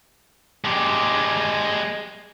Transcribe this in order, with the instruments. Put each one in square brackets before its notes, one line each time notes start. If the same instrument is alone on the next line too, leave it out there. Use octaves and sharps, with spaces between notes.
[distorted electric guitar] G#3 G4